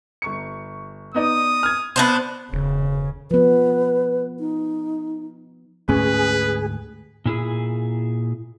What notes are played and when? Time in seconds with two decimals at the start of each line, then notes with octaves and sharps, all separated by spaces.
0.22 G1 C#6 C#7
1.14 B3 D#4 D5 D#6
1.63 F6 G#6
1.96 B3 D4 C5
2.52 E1 C#3
3.31 F3 B3 B4
4.39 D#4
5.89 D2 G#2 A3 C#4 G#4 B4
7.25 A#2 E4 G#4